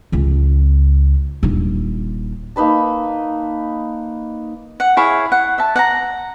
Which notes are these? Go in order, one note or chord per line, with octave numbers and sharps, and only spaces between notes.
C#2 C#4
D#1 D4
A#3 D#4 B4 A5
F#5
E4 G#4 C#5 F5
F#5
E5 A5
F#5 G5 A#5